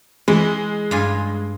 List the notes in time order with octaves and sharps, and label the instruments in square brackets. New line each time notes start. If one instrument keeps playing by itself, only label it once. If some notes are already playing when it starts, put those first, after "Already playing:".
[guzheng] E3 [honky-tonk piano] G#3
[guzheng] G2 F4 G#5